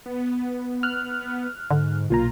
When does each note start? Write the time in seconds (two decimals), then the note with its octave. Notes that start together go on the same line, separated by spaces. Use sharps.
0.06 B3
0.83 F6 F#6
1.71 G#2 D3
2.10 B1 A#2 F4 A#5